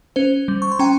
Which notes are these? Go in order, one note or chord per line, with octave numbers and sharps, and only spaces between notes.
C#4 C5
G3
C#6
C6
C#4 G5 A#5